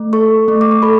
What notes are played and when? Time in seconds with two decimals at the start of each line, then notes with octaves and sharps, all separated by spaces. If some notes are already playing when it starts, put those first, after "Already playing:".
Already playing: A3
0.13 A4 C#6
0.48 A3
0.61 D6
0.71 C#6
0.82 A4 B5